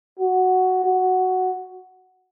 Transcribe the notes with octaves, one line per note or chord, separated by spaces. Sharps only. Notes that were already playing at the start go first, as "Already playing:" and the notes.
F#4
F#4